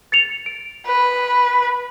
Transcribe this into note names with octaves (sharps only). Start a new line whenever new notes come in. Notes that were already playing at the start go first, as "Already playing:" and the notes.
A6 C#7 F7
D7
B4